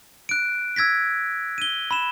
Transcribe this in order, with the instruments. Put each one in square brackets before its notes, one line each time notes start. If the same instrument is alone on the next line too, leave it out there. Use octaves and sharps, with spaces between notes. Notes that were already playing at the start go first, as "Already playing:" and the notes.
[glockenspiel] F#6 D7
E6 G#6 A#6 B6
D#7 G7
B5 E7